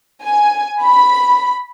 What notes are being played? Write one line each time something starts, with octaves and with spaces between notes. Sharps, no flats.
G#5
B5